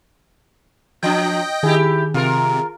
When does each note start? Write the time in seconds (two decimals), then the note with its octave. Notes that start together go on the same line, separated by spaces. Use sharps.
1.03 F3 D4 D#5 G5
1.63 D#3 E4 G4 G#4
2.14 C3 F4 A#4